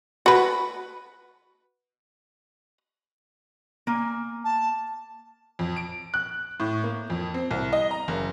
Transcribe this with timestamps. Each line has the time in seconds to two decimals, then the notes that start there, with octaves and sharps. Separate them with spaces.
0.26 F#4 B4
3.87 A#3 G#5
4.44 A5
5.59 F2
5.76 D7
6.14 F#6
6.60 A2
6.84 A#3
7.10 F2
7.34 C4
7.51 C2
7.73 D#5
7.91 A#5
8.08 F#1